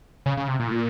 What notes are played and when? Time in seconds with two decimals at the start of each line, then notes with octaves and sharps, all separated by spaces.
0.26 C#3
0.37 C#3
0.48 C3
0.60 A#2
0.68 A2
0.71 A#2